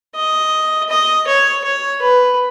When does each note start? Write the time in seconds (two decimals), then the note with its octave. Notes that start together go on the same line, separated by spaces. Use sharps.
0.15 D#5
0.90 D#5
1.27 C#5
1.64 C#5
2.02 B4